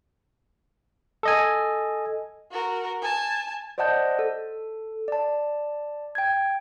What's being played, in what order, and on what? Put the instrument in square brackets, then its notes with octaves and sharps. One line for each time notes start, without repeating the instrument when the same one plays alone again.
[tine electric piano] A4 D#5 G#5
[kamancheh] F#4 A#4
G#5 A5
[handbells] C5 D5 D#5 F#5 A5 G6
A4
D5 A5
G5 G#6